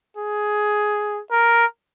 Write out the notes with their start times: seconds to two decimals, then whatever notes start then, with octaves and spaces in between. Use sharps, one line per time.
0.17 G#4
1.31 A#4